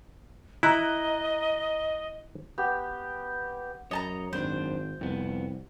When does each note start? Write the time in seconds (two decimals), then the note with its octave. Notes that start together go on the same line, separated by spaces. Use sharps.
0.63 E4 D#5 A#5 F#6
2.58 B3 G4
3.91 F#2 C#5 D#5 A5 A#5
4.33 G#1 F#2 D4 C5
5.01 C2 F2 B3